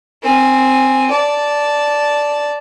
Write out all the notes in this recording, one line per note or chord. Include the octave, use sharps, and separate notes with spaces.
C4 G#5
D5 A5